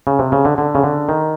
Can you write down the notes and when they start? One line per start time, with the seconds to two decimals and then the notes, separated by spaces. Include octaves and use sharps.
0.07 C#3
0.19 C3
0.32 C#3
0.45 D3
0.58 D3
0.75 C#3
0.84 D3
1.09 D#3